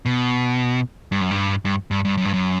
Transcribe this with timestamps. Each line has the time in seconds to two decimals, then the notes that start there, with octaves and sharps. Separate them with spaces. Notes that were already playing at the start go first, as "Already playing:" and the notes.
0.05 B2
1.12 G2
1.21 F#2
1.31 G2
1.65 G2
1.91 G2
2.05 G2
2.18 F#2
2.25 G2
2.33 F#2